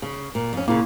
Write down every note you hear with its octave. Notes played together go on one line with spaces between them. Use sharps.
C#3
A#2
F2 C#4
A#2 C#3 A#3 E4